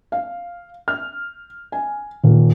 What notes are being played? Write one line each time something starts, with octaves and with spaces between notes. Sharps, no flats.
F5
F6
G#5
D#1